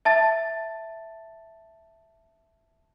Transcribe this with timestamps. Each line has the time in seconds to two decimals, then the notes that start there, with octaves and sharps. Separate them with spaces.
0.05 E5 A5 A6